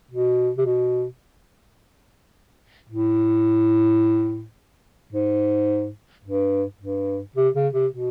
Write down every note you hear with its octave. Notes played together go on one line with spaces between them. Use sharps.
B2
C3
B2
A2
G#2
G2
G2
C3
C#3
C3
B2